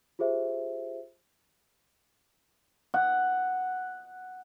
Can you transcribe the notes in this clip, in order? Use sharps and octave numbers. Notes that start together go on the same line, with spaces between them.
F4 G4 G#4 C5 E5
F#5